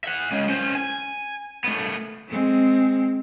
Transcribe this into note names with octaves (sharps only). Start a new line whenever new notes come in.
E5 F#5
G#3 C#4
C#4 C5
G#5
A3 B3
G#3 C4